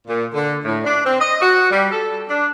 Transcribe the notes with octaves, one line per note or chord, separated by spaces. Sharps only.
A#2
D3
A2
D4
C4
D#5
F#4
G3
A4
D4